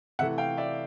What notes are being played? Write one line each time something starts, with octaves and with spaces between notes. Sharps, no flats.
C3 E3 A3 E5 F#5
F5 G5
D5 E5